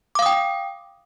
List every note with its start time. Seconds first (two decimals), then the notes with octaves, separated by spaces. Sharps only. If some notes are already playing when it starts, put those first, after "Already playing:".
0.15 D6
0.19 F5
0.22 D#6
0.26 G5